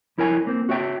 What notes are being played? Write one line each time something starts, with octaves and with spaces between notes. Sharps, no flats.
F2 E4 A#4 C#5 G#5
A#3 C4
F#4 C#5 E5 G5